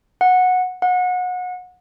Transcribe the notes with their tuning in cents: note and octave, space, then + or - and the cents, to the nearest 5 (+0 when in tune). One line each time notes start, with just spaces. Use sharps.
F#5 -15
F#5 -30